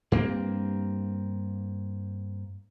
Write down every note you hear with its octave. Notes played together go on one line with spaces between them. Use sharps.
G2 A#3 C4